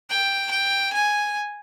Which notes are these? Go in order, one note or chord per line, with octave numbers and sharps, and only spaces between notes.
G5
G5
G#5